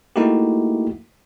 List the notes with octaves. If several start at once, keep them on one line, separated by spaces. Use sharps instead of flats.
A3 A#3 D#4 E4 F#4 G4